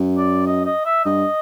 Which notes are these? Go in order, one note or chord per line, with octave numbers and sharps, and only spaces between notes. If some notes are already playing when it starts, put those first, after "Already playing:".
Already playing: F#2
D5
D#5
D#5
E5
G2 D#5